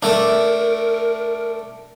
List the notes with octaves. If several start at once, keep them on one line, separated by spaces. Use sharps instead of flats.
A3 D4 A#4